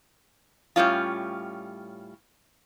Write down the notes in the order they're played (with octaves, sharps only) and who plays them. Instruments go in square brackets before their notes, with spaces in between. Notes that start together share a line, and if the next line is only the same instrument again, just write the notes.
[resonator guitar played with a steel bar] A2 G3 C#4 F4